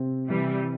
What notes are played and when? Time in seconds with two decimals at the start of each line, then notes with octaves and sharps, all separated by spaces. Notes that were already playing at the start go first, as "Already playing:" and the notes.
Already playing: C3 C4
0.29 C3 E3 G3